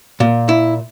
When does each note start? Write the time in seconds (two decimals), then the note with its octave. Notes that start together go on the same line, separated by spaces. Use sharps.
0.20 A#2
0.49 E4